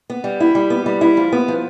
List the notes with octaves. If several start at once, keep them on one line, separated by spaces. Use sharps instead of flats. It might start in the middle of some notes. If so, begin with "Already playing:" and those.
B3
G3
E4
G3
B3
G3
E4
F3
B3
F3